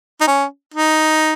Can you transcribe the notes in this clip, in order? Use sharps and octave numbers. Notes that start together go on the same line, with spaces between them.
D#4
C#4
D#4